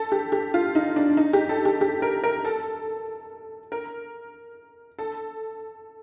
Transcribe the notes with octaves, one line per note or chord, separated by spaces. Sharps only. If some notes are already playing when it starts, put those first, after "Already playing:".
Already playing: A4
G4
G4
F4
D#4
D4
D#4
G4
A4
G4
G4
A#4
A#4
A4
A#4
A4